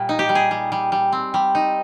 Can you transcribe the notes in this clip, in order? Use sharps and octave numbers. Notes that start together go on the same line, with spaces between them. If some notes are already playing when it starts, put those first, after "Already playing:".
Already playing: A#2 G3
D#4
G4
G3
G#4
G3
G3
G3
C4
G3
D#4